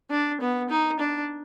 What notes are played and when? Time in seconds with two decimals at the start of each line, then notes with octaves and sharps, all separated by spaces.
0.11 D4
0.41 B3
0.70 D#4
1.00 D4